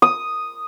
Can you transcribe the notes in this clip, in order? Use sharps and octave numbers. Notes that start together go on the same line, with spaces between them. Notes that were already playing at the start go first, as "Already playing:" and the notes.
D#6